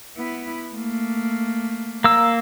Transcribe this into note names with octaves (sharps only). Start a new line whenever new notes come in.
B3 E4
A3 A#3
A#3 E6